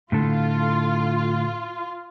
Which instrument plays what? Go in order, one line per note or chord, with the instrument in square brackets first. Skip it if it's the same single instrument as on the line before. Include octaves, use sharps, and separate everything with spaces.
[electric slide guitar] A2 D3 A4 [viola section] F4